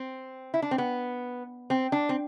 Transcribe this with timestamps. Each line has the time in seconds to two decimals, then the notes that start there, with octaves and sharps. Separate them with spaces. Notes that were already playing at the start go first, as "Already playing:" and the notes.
Already playing: C4
0.54 E4
0.62 D4
0.71 C4
0.78 B3
1.70 C4
1.92 D4
2.09 C4